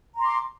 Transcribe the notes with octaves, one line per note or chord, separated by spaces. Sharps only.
A#5 C6 D6